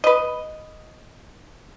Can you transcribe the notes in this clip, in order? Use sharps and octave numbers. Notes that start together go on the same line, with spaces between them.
B4 D#5